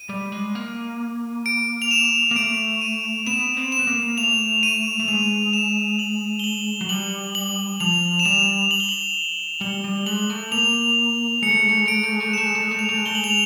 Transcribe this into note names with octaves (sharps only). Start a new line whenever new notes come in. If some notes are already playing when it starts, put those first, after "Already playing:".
Already playing: D#7
G3
G#3
A#3
D7
F7
E7
A#3
A3 D7
D#7
B3 E7
C4
E7
B3
A#3
A3 F7
D#7
A3
G#3 F7
E7
F#7
G7
F#7
F#3
G3 F#7
F#7
F3 F7
E7
G3 F7
F#7
G7
F#7
G3 G7
G3
G#3 F#7
A3
A#3 F7
G#3 C#7
A3
G#3
A3
G#3
A3 D7
G#3
A3
G#3
A3
G#3
A3 E7
G#3
A3
G#3
A3
G#3 F7
A3
G#3
A3 G7
G#3 F#7
F7